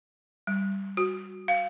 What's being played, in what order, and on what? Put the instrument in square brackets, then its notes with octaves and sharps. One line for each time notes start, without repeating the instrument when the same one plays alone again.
[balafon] G3
F#4
F5